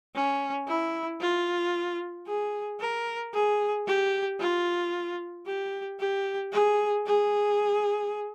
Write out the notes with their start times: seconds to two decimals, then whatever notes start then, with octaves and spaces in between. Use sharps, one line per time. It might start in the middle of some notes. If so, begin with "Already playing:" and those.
0.15 C#4
0.68 E4
1.21 F4
2.27 G#4
2.80 A#4
3.34 G#4
3.87 G4
4.40 F4
5.47 G4
6.00 G4
6.52 G#4
7.06 G#4